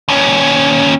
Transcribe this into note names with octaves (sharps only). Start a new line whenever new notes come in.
D#2 C#4